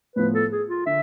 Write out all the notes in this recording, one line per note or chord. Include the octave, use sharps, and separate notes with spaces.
A2 F3 B3 B4
A4
G#4
F4
D3 E5